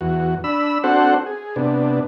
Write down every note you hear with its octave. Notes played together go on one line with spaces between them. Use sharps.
E2 F#4
D4 B5 E6
C4 D4 F#4 A4 C5 F#5
G#4
C3 B3 D4